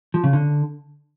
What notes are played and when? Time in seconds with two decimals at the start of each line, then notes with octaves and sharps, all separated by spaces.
0.14 F3
0.24 C#3
0.33 D3